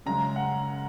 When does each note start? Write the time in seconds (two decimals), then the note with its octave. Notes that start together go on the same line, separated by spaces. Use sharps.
0.06 F#2 C#3 G#3 A#5
0.36 F#5